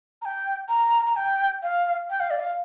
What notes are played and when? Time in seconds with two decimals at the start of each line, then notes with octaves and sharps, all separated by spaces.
0.22 A#5
0.25 G5
0.69 A#5
1.07 A#5
1.16 G5
1.63 F5
2.10 G5
2.20 F5
2.30 D5
2.40 F5